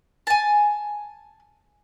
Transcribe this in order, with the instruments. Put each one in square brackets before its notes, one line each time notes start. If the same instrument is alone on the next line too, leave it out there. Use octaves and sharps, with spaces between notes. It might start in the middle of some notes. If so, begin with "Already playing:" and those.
[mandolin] G#5 A5